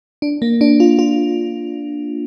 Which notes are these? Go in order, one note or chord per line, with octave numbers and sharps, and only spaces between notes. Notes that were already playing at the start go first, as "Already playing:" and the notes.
D4
A#3
D4
F4
F4